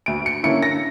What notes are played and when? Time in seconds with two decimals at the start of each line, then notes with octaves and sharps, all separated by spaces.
0.06 D2 D7
0.26 C#7
0.43 D3 A#3 C#4 E4 C#7
0.63 A#6